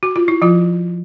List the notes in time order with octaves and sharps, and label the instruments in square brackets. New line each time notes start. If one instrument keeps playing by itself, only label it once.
[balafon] F#4
F4
E4
F3 F4